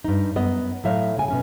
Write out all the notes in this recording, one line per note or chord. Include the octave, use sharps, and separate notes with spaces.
G2 D#4
F#2 B3 D#5
A2 F#3 E5 F5
C#3 G#5
B2 C#4 G#5